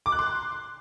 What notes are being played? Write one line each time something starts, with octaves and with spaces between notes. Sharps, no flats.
D6
F#6
C6